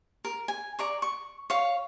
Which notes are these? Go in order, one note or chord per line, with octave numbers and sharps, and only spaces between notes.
A#4
G#5
D5 A#5 C#6
C#6
C#5 F5